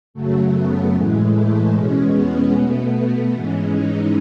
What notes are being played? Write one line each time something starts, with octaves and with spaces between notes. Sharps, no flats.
F#2 C#3 F#3 A3
B3
A2 E3 G#3
A3
E2 B2 G#3 C#4
B3
B2 A3 B3
G#2 E3 G#3 C#4
D#4